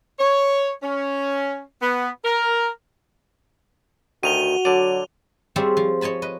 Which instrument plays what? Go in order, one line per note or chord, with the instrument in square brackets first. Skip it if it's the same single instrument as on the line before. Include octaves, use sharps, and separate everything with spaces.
[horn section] C#5
C#4
B3
A#4
[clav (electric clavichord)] D2 D#3 [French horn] F#4 [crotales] D#7 F7 G7
[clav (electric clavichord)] D3 D5 [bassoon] F#3 [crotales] D#7
[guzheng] G3 C4 F4 G#4 C#5 E5
F3
C#5 D#5 G#5 A5 B5
B4 D#5